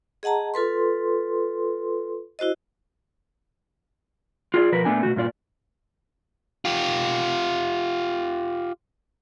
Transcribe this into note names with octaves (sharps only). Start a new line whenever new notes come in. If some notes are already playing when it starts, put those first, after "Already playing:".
G#4 D#5 F#5 A5 A#5
F4 A4 B4 C6
E4 F#4 C5 D#5
F4 G#4 C#5 D5
B2 F3 A#4 B4
A#2 A3 B3 D4 G#5
B2 D#3 A3 F#4
G2 A#2 F4 D5
F4 G4